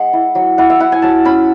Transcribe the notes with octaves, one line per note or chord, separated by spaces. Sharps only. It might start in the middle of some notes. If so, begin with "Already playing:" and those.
Already playing: G#3 F#5
E4
F#3
E4 F#5
E5
E4 F#5
G#5
F#3 A5
C#4 B5